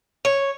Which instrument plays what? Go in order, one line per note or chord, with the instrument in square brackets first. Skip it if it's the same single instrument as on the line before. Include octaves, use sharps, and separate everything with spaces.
[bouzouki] C#5